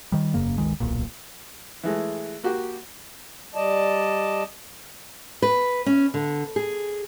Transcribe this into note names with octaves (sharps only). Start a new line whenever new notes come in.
D#3 G3
E1 F#2 C#3 A#3
G1 C#2 D#3 G#3
D1 B1 A#2
E3 G#3 A3
A#3 F#4 G4
G3 D5 D#5 A5
B4
C#4
D3
G#4